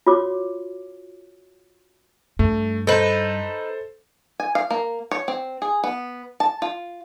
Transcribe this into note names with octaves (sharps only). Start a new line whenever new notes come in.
F4 F#4 C#5 D6
G2 A3
D#4 A4 B4 C5
G#5
F5
A#3
C#5
C4
G#4
B3
A5
F4